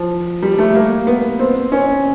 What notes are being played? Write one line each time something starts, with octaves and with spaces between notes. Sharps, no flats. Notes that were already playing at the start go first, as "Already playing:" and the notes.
Already playing: F3
G3
A3
A#3
B3
C4
C#4